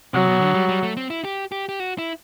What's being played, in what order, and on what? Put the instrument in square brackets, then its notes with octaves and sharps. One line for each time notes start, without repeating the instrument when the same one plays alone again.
[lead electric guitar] C3 [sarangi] F#3
[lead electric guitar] B2
D3
G3
G3
A3
C4
E4
G4
G4
G4
F#4
E4